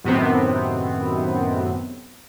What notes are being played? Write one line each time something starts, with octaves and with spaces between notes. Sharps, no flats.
F#2 A2 C3 D#3 B3 C4